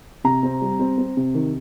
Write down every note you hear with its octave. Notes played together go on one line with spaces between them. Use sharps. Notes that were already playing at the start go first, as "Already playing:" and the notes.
C3 A#5
C4
G3
C4
C4
C3
D#3